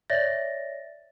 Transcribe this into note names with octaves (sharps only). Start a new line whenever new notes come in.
C#5 D5 E5 A6 A#6